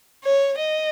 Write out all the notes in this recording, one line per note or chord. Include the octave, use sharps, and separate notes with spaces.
C#5
D#5